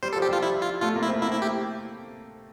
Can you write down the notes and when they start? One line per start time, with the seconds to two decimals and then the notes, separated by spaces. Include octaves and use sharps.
0.03 G3 C5
0.13 A4
0.16 F3
0.22 G4
0.29 G3 F4
0.43 E4
0.62 F4
0.82 A3 F4
0.96 A#3
1.03 E4
1.09 C4
1.22 A#3 E4
1.33 E4
1.42 G4